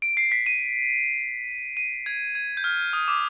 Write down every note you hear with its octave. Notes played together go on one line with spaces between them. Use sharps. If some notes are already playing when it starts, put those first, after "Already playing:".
D7
C7
B6
D#7
D#7
G#6
G#6
G6
F6
D#6
D6